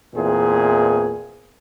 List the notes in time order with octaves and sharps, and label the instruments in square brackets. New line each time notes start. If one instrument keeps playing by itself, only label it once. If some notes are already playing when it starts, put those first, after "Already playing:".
[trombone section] E2 A#2 E3 C4 G#4